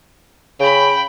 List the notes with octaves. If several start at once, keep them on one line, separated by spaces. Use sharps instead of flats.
C#3 G5 B5